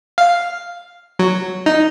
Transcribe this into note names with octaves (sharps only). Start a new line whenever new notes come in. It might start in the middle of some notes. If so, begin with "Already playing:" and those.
F5
F#3
D#4